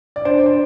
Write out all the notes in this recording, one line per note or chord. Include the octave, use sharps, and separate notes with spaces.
D5
D4 C5
C5